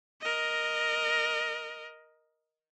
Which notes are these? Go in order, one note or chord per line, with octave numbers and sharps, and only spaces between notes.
A#4 D#5